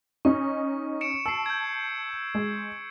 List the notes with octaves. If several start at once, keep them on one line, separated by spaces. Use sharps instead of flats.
C#4 D#4 C#6
C#7 D7 E7
A5 E6 C7
G6 G#6
G#3